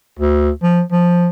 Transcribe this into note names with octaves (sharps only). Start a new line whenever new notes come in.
D2
F3
F3